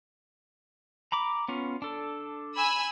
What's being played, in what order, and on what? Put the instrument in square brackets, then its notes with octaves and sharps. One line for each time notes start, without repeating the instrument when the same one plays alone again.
[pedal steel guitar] A#5 B5 D6
B3 C#4 F4
D4 A4
[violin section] G#5 B5 E6